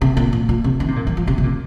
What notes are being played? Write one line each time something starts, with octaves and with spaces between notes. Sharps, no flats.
C3
A#2
A#2
A#2
C3
D#3
C3
A#2
F3
F3
C3
C3
A#2